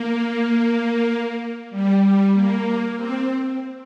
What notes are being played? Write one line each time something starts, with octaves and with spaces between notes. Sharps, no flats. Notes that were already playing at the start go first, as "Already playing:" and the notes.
Already playing: A#3
G3
G3
A#3
C4